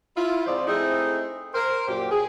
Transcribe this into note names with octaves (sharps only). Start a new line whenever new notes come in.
E4 F4
G#2 F3 C4 C5 D5 D#5
A3 C4 D#4 E4 G#4
A#4 C5
F#2 A#2 G4
G#4